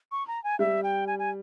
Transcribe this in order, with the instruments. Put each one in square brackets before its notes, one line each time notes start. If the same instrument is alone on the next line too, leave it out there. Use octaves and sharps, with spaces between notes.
[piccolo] C#6
A#5
G#5
[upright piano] G3 [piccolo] E5
[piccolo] G5
G#5
G#5